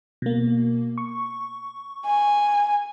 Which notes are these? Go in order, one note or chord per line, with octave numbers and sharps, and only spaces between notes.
B2 A#3
C#6
G#5